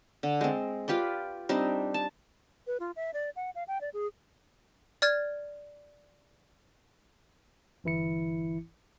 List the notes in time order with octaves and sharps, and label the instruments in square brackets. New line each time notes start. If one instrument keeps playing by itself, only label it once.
[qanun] D3
G#3 C4
F4 G4 B4 D5
G3 C4 D4 D#4
A5
[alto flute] B4
F4
E5
D5
F#5
F5
G5
D5
G#4
[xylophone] D5 F6 G#6 A6
[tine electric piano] G1 E3 E4 C#7